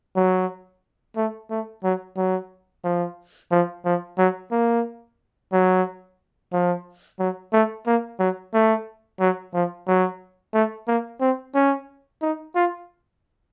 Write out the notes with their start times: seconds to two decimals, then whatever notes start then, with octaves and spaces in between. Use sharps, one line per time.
0.16 F#3
1.17 A3
1.50 A3
1.84 F#3
2.17 F#3
2.84 F3
3.51 F3
3.85 F3
4.18 F#3
4.51 A#3
5.52 F#3
6.53 F3
7.19 F#3
7.53 A3
7.86 A#3
8.19 F#3
8.54 A3
9.20 F#3
9.54 F3
9.87 F#3
10.54 A3
10.88 A#3
11.21 C4
11.55 C#4
12.22 D#4
12.55 F4